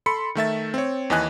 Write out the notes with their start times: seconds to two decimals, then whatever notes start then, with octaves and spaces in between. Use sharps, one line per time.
0.06 A4 B5 C6 C#7
0.35 D#3 A3 E5 A6
0.74 C4 C#5
1.10 D#2 E3 D#5 G#5 F#6